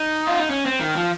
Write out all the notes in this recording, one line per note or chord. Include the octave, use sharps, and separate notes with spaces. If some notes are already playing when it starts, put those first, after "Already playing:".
Already playing: D#4
F4
D#4
C#4
C4
D#3
F3